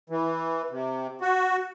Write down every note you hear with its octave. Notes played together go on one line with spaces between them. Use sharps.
E3
C3
F#4